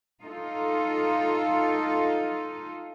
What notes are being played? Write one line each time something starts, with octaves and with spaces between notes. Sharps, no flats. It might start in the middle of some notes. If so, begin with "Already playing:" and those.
D#4 F4 A4